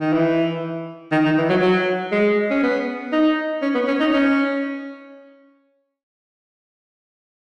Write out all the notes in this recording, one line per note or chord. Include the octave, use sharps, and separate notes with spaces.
D#3
E3
D#3
D#3
E3
F#3
F#3
G#3
C#4
B3
D#4
C#4
B3
C#4
D#4
C#4